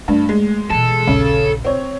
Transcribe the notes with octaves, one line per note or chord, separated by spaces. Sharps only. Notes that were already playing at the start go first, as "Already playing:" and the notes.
G2 A3
G#3
B2 E3 A4
A#1 D#2 C#3
C4 C#5